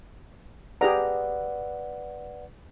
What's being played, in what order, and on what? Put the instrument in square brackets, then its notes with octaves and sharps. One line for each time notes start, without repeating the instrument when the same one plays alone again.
[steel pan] G4 G#4 A#5 [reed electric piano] B4 D5 F#5